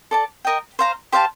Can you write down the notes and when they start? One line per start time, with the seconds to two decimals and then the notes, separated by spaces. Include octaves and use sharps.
0.11 A4 D5 A5
0.45 A#4 D#5 G5
0.79 C5 F5 A#5
1.12 G4 C5 F5 A5